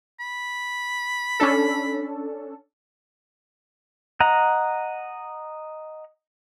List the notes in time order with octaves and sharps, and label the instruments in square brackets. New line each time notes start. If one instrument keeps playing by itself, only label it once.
[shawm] B5
[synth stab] C#4 D4 A4
[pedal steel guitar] D#5 F#5 A#5